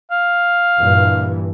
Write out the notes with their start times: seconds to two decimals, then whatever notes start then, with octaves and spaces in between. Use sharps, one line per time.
0.11 F5
0.81 G2 A#2 E3